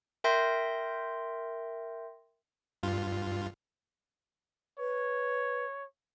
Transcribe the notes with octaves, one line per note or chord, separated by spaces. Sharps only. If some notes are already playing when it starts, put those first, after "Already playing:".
A#4 E5 G5 C6 G6 A#6
G2 F4
B4 C#5